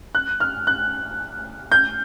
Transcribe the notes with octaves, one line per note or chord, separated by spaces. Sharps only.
F#6
F6
F#6
G6